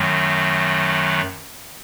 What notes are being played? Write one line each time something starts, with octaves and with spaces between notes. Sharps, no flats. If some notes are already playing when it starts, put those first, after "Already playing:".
Already playing: F#2 D#3 F#3 A3